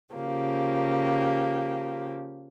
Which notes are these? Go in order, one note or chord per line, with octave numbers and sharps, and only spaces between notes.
C#3 F3 A#3 G4